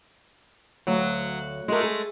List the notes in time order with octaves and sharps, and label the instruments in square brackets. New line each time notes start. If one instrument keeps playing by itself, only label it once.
[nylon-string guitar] D2 F5 [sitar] F#3
[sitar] G#3 A3 [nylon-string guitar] F#4 A#4
[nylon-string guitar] G#4